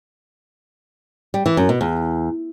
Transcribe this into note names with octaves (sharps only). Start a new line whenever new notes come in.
G3
E3
F#2
B2
E2